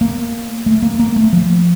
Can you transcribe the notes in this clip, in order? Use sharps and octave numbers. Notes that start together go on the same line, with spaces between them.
A#3
A3
A#3
A#3
A3
F3